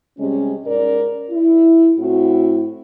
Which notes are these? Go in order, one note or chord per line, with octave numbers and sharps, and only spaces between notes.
C3 G3 G#3 C#4
G#2 C#4 A#4 D5
E4
A2 C4 E4 F#4